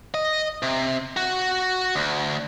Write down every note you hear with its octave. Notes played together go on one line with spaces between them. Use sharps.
D#5
C3
F#4
D2